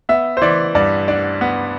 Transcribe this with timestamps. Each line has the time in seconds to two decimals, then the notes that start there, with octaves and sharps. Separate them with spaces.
0.09 B3 E5
0.37 C5
0.41 E3 D5
0.75 G2 D5
1.08 D4 D5
1.41 B3